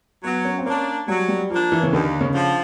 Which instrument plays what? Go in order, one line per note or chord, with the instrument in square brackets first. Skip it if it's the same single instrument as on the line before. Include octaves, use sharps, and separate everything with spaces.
[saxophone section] F#3 [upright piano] B3
[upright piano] C#4
C4
[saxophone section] A#3 D4 [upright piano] C#4
[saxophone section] F#3 [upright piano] G3
[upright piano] G3
[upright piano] F3 [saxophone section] A#3 D4
[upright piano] E3
C#3
[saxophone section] D#2 [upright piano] D3
[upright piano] C#3
[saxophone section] D3 F3